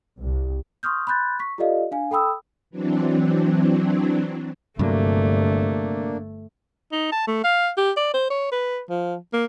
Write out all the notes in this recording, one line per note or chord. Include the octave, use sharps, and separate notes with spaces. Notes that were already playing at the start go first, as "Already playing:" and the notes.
C2
C6 C#6 D#6 F6 G6
B5 C6 F#6 G6 A6
C#6 B6
F4 G4 A4 D5 D#5 F5
D4 F5 G#5
A4 G5 B5 D#6 E6
E3 F#3 C4 D4
G1 G2 C3 F#3 A3 A#3 D4
D#4
A5
A3
F5
G4
D5
C5
C#5
B4
F3
A#3